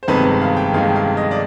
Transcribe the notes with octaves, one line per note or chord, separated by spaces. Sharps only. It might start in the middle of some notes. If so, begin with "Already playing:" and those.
C5
G1 F2 C3 D#3 G#3 B4
B4
F5
G5
G1 F2 C3 D#3 G#3 F5
F5
D#5
D5